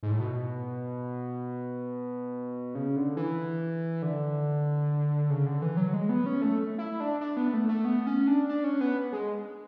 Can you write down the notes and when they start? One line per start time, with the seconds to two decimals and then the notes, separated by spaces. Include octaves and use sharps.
0.03 G#2
0.11 A2
0.20 B2
2.75 C#3
2.96 D3
3.17 E3
4.02 D3
5.30 C#3
5.46 D3
5.62 E3
5.77 F#3
5.93 G#3
6.09 B3
6.26 C#4
6.42 A3
6.78 E4
7.00 D4
7.21 D4
7.37 B3
7.54 A3
7.69 A3
7.85 B3
8.07 C#4
8.27 D4
8.49 D4
8.64 C#4
8.81 B3
9.13 G#3